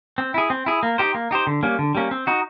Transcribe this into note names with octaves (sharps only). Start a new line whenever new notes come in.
C4
E4 G#4
C4
E4 G#4
A#3
D#4 G4 C5
A#3
D#4 G4 C5
D3
G3 A#3 C#4
D3
G3 A#3 C#4
C4
D#4 F#4